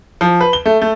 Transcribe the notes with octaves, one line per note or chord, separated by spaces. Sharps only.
F3
B4
G7
A3
A3